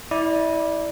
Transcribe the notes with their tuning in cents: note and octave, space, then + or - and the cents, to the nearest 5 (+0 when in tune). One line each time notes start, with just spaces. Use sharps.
E4 -25 D5 +0